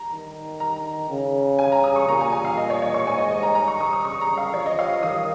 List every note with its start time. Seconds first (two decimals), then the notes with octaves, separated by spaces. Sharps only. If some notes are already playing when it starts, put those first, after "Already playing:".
Already playing: A#5
0.11 D#3
0.60 A#5
1.10 C#3
1.59 G#5
1.72 A#5
1.84 D#6
1.96 C#6
2.08 A#2 A#5
2.21 G#5
2.33 G#5
2.45 F5
2.57 D#5
2.70 C#5
2.82 C#5
2.94 C#6
3.07 G#2 G#5
3.18 D#5
3.31 D#5
3.43 A#5
3.55 A#5
3.68 C#6
3.80 D#6
3.93 D#6
4.04 C#3 C#6
4.21 A#5
4.38 F5
4.54 F3 C#5
4.66 D#5
4.79 F5
5.03 D#3 D#6